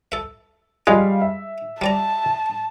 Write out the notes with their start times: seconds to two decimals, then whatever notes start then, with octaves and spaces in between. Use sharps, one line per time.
0.12 A4 E5
0.87 F2 G3 G#3 F4 F5
1.21 E5
1.81 G3 D5 A5 A#5